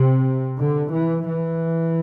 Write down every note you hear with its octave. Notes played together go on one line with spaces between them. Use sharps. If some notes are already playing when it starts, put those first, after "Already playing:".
Already playing: C3
D3
E3
E3